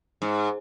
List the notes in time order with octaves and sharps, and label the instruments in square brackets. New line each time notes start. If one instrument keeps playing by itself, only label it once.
[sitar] G#2